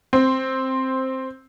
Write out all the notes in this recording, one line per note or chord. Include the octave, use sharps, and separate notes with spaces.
C4